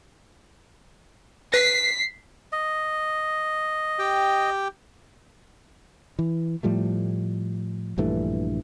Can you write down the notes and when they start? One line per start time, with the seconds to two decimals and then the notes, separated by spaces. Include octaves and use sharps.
1.54 B4 B6 C7
2.52 D#5
3.99 G4 G5
6.19 E3
6.63 A2 F3 G3 A3
7.98 A#1 G2 E3 A3